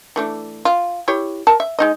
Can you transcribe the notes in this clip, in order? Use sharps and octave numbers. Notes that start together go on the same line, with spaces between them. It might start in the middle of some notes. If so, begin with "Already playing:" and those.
E3 A3 D4
F4
E4 G4 C#5
A#4 A5
E5
G#3 D#4 D#5